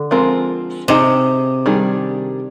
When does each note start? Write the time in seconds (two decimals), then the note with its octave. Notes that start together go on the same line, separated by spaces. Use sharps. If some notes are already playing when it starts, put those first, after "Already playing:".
Already playing: D3
0.11 F3 G#3 C4 F4 A#4
0.88 C3 C4 D#4 G#4 D#5
1.66 D#3 G3 D4 G#4